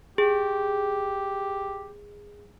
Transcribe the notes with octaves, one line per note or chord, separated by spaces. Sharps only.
G4 G#4